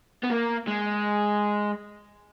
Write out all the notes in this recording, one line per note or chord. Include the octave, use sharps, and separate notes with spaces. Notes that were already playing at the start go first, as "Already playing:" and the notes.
B3
A#3
G#3